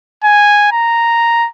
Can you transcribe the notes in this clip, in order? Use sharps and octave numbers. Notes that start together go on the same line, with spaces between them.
G#5
A#5